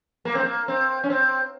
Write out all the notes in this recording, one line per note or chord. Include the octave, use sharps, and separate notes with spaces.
A#3
C4
A#3
C4
C#4
C4